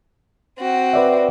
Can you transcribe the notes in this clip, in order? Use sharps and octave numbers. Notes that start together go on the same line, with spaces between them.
C4 F#4
B4 D5 E5